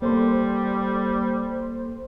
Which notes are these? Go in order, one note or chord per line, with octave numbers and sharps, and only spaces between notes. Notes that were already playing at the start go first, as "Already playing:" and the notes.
G3 A#3 A4 C5 C6